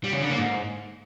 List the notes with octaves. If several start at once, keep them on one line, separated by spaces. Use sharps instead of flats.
G3
C#3
D3
A#3
G#2